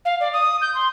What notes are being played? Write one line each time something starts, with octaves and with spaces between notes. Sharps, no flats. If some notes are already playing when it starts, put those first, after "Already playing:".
F5
D5
D#6
G6
C6